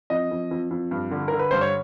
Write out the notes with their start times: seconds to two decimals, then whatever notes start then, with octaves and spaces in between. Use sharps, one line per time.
0.10 F2 D#5
0.31 F2
0.51 F2
0.71 F2
0.91 G2
1.11 D3
1.28 D3 A#4
1.39 B4
1.51 G2 C5
1.61 C#5